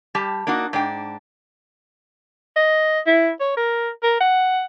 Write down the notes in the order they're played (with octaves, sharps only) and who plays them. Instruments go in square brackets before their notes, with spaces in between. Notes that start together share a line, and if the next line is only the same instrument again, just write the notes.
[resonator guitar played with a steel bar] G3 G4 A5
A#3 D4 D#4 F#4
G#2 D4 G5
[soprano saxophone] D#5
E4
C#5
A#4
A#4
F#5